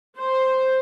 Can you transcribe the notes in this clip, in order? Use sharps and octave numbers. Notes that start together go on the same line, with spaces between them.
C5